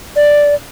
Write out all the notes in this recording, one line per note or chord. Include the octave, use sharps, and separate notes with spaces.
D5